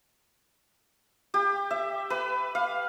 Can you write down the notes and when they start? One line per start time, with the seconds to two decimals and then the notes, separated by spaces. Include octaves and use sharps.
1.34 G4
1.71 E5
2.10 B4
2.55 F5